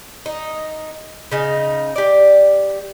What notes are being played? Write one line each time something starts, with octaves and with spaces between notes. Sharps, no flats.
D#4
C#3 D#4
G4 D5